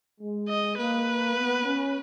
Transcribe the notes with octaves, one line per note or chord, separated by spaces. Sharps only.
G#3
D#5
A#3 B4
B3
C#4